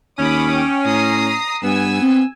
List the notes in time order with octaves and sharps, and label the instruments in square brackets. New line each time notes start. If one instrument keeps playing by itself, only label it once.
[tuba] D#2 [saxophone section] C#4 [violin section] B5 D6 D#6
[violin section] G5
[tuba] A2 [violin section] A#5 D#6 C7
[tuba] G2 [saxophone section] B3 [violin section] G#5 E6
[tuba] C4